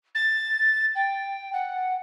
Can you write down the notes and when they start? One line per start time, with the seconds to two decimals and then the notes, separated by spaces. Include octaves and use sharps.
0.15 A6
0.95 G5
1.53 F#5